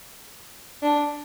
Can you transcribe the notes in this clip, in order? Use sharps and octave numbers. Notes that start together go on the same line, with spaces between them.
D4